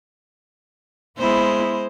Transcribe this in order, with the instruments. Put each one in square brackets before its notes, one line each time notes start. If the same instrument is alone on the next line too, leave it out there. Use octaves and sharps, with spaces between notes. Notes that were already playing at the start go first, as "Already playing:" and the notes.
[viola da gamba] G#3 C5 [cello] B3 E4